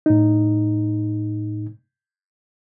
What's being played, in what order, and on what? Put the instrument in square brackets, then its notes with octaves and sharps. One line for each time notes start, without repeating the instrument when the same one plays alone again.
[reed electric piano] A2 D#4